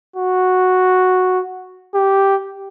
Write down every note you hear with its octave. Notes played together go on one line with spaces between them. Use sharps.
F#4
G4